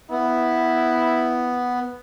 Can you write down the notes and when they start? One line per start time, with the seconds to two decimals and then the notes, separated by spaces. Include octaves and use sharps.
0.10 B3 E4